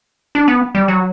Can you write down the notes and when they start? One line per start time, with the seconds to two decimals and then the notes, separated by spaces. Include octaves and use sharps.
0.35 D4
0.48 B3
0.75 G3
0.88 F#3